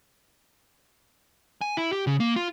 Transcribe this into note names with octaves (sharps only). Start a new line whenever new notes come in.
G#5
E4
G4
C#3
A#3
F4